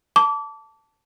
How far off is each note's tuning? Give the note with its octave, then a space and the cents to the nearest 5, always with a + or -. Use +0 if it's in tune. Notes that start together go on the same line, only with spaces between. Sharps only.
A5 +5 D6 -30